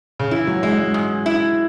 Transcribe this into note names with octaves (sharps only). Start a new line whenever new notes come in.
C#3
E3 E4
F#3
G#3 E4
G#3
G#2
E4